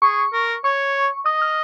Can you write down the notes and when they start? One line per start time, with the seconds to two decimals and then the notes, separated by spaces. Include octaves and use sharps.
0.02 G#4 C#6
0.33 A#4
0.64 C#5 C#6
1.26 D#5 D#6
1.41 F6